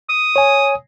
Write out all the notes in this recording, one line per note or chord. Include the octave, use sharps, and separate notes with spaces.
D#6
C#5 G#5